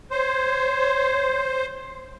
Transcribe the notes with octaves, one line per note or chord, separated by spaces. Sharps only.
C5 C#5